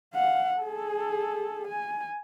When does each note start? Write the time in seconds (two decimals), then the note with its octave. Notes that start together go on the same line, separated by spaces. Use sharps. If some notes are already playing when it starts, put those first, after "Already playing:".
0.14 F5 F#5
0.60 G#4 A4
1.68 G#5